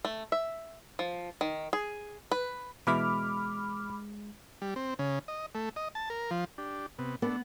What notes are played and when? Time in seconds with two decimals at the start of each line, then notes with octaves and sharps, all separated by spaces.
0.05 A3
0.32 E5
0.99 F3
1.41 D#3
1.73 G#4
2.32 B4
2.87 B2 E3 G#3 E4 B5 D6 F6
4.62 G3
4.76 C4
4.99 C#3
5.28 D#5
5.55 A3
5.76 D#5
5.95 A5
6.10 A#4
6.31 F3
6.58 D4 G4
6.98 C3 B3
7.22 A3 B3 D4